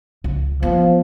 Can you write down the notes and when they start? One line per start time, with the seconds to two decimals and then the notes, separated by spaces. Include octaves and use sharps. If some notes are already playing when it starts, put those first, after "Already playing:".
0.24 C#2
0.63 E3 F3 B3